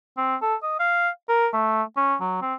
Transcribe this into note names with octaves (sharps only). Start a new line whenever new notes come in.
C4
A4
D#5
F5
A#4
A3
C#4
F#3
C4